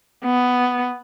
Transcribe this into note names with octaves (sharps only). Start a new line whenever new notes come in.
B3